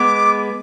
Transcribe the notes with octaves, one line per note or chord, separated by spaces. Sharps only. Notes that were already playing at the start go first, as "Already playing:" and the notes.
Already playing: G#3 B3 D6